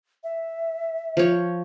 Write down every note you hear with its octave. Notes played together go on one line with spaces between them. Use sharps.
E5
F3 C#5